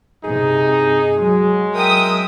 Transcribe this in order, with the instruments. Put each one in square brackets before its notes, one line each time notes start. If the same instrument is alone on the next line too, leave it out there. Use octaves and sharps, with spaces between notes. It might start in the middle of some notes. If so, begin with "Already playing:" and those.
[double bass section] G2 C3 [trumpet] D#4 [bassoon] G#4
[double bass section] F#3 [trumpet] G#3
[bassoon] A#4 [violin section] E5 G5 D#6